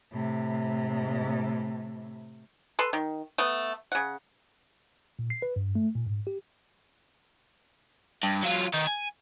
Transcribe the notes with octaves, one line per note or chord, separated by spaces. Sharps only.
A2 C3
A4 B4 C6
D#3
A3 B3
C#3 F#5
A#2
C7
B4
G2
A3
A#2
G#2
G4
G2
F#3 F4
D#3 D#4
G#5